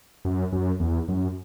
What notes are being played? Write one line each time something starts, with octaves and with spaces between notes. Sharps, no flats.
F#2
F#2
E2
F#2